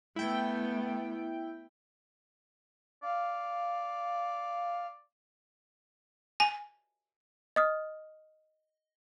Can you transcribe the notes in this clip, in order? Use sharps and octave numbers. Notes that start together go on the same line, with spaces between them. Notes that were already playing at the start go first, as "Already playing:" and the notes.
A3 B3 E4 G5
D5 F5
G#5 D#7
D#5 D#6 F6